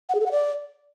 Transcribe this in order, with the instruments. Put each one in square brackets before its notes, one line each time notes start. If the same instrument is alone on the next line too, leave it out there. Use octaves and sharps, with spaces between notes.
[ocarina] F#5
G#4
A4
F#5
D5